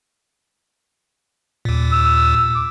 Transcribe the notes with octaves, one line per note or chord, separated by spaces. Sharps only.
D#2 A#2
E6
D6